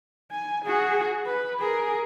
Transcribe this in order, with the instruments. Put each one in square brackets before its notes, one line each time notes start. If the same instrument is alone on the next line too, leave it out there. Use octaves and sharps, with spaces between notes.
[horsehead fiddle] G#5
F#4 G#4
B4
G#4 A#4